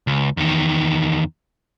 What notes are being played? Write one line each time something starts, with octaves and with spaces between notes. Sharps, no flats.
C#2
E2 D#3